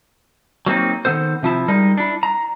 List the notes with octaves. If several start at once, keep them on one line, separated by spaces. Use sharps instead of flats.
F#3 A#3 C4 D#4
D#3 G3 B3 A4 C5
C3 F3 E4 A5
G3 G#3 D#4 A#4
D4 E4
A#5